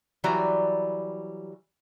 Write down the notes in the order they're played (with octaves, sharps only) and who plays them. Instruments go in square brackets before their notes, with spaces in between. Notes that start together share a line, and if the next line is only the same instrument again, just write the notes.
[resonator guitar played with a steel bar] E3 F#3 G3 D5 A#5